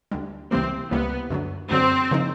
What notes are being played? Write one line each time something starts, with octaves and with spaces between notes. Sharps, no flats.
D2 D3 G3
C#2 C3 E3 G3 A#3 C4
C#2 C3 E3 G3 A#3 B3
F#2 D3 F#3
F#2 D3 F#3 C4
C#3 F3 A#3 D#4